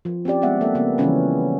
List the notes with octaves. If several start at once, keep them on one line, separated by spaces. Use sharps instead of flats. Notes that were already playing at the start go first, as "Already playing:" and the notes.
F3
C4 C#4 G4 D5
G3 G#3 B3 C4 E5 F#5
A#3 A4 E5
C#3 A#3 B3
C#3 E3 F3 G3 C#4 B4